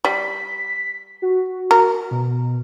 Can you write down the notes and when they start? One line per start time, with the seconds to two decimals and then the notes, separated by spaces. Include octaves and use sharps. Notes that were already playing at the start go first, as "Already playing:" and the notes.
0.05 G3 B6
1.22 F#4
1.71 A#4
2.11 B2